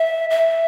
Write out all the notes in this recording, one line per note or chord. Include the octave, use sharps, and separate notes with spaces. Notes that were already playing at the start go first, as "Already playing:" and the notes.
Already playing: E5
E5